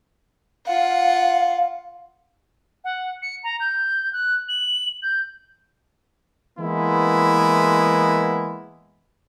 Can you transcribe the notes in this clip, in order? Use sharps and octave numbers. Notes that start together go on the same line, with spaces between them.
F4 F5 F#5
F#5
C#7
A#5
G6
F#6
F#7
G6
E3 G#3 A#3 B3 E4